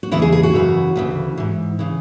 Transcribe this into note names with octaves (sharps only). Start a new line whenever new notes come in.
F#4
E2 C#3 E3 E4
G#4
G#4
F#4
F#2 C#3 E3
D2 C#3 E3
G#2 E3
C#3 E3